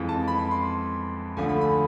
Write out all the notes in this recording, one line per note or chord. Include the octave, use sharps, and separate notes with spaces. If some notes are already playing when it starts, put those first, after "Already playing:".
Already playing: F2 E3 G#3
A5
B5
B5
C6
D2 D3 F3 A3 G#5
B5
B5